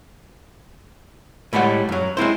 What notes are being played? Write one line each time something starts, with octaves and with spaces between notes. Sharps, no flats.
A2 G3 G#3 D5 F#5
F#2 F#3
G#3 C4 E4 C5